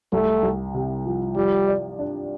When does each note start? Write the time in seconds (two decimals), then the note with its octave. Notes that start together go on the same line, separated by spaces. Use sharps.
0.12 C2 A3
0.43 C2
0.74 C3
1.06 F3
1.36 F3 G3
1.68 D5
1.99 D4